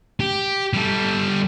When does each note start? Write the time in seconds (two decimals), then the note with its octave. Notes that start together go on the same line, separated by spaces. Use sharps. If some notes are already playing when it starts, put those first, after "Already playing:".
0.20 G4
0.73 G3 A4